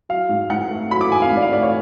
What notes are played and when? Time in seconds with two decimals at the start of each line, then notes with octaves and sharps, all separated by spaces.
0.09 F#3 F5
0.29 G#2
0.50 G#2 F#5
0.71 A3
0.91 F#3 B5
1.01 D6
1.12 G#2 G#5
1.22 F5
1.32 G#2 D5
1.42 F5
1.52 A3 D5
1.62 C#5